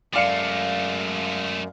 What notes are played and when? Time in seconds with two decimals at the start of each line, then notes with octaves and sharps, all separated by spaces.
0.13 F#2 G#3 A3 D5 F5 C#7